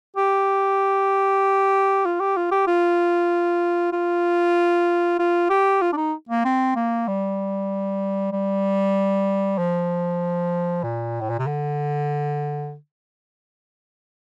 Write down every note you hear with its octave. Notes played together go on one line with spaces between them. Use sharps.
G4
F4
G4
F4
G4
F4
F4
F4
G4
F4
D4
D#4
A#3
C4
A#3
G3
G3
F3
A#2
A2
A#2
C3
D3